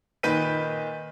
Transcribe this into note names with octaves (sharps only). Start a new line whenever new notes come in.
A#2 D#3 B4 G6 B6 D#7